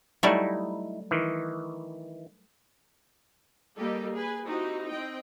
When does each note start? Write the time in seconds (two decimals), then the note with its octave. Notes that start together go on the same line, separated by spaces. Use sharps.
0.23 F#3 G3 A3 D#4 E4
1.11 D#3 E3
3.77 G3 A#3 G4 A4 D#5
4.14 G#4 B4 G#5
4.46 C4 D#4 E4 F#4 G4
4.89 C4 D#5 G5